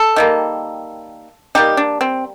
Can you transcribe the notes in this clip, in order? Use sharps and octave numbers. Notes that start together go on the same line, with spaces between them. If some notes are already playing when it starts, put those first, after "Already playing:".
Already playing: A4
D#3 G3 A#3
D3 G3 A#3 D#4 G4
D4
C4